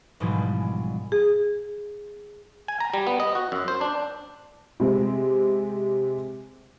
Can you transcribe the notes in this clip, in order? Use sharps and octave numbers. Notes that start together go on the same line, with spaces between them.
A#1 G#2 B2 E3 G3 G#3
G#4
G#5
A#5
G3
B3
D#5
F#4
F#2
C5
D4
C3 G#3 C4